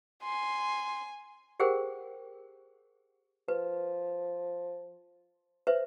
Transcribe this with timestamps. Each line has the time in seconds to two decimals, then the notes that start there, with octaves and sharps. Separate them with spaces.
0.23 G#5 C6
1.60 G4 G#4 A#4 C5 F#5 G5
3.48 F3 B4
5.67 B4 C5 E5